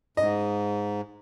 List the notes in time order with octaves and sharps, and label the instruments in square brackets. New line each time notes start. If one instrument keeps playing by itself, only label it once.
[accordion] G#2 [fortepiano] D#5